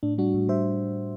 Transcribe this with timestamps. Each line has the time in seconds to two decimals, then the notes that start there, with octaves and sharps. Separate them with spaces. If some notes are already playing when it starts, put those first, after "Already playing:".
0.03 A2 D4
0.18 G3 D4 F#4
0.34 A2
0.48 G3 C5 E5